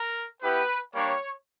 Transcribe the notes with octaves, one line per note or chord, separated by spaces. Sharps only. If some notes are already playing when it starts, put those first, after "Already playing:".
Already playing: A#4
B3 E4 G4 B4
G3 A#3 D4 C#5